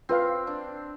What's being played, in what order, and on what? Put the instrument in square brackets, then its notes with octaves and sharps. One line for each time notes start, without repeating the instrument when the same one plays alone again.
[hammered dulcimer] C4 [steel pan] F4 B4 F5
[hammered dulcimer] D4